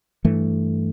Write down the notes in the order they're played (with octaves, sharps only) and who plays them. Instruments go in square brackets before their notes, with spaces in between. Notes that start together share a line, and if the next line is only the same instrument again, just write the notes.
[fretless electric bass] G2 E3 A3